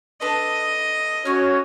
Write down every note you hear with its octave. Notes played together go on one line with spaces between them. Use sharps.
D4 A4 B4 D#5
A3 C#4 F#4 C#5 F6